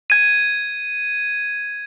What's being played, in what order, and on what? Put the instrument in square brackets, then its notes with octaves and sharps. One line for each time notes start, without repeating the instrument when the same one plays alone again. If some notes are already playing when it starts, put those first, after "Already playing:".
[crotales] G#6 D#7